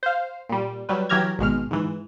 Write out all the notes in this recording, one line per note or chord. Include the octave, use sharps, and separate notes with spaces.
C5 F5
A#2 G3
F#3 G3 B4
E3 F#3 G4 A#5 F6 G#6
G#1 B2 G#3 F6
G#2 E3